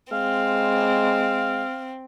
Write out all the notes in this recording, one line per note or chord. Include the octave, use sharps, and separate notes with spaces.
G#3 C4 F5